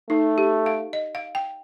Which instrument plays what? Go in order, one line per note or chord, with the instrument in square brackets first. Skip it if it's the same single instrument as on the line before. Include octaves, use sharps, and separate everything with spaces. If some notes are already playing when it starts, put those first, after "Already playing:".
[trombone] A3 [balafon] D#4
[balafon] G4
F5
D#5
F5
G5